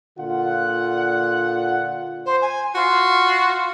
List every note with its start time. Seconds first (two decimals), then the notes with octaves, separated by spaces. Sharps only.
0.18 A#2 D3 F4 F#5
2.26 C5
2.42 G#5
2.75 F4 F#4